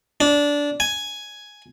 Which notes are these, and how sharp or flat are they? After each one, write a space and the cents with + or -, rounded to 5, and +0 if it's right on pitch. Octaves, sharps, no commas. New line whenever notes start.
D4 -15
G#5 +5